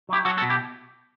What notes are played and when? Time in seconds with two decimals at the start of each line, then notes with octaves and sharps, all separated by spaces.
0.09 F#3 E4 G4
0.25 F#3 F#4 A4
0.37 F#4 A4
0.42 B2
0.49 E4 G4